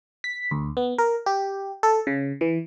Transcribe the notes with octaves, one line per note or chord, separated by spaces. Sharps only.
B6
D2
B3
A#4
G4
A4
C#3
E3